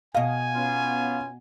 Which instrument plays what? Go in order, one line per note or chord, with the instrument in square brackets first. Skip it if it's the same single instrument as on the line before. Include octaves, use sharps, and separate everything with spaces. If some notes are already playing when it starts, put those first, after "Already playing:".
[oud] B2 D#5 [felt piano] F5 [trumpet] G#5
[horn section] B3 C#4 F4